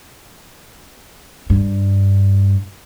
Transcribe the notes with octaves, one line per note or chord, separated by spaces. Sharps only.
G2